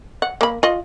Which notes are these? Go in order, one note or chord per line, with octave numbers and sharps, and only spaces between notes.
F#5
A#3 B5
F4 D#5